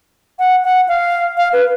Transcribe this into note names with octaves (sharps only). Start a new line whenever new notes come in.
F#5
F#5
F5
F5
B4